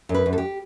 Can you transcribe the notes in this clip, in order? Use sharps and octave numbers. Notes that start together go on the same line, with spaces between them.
F#2
B4
F#2
A4
G4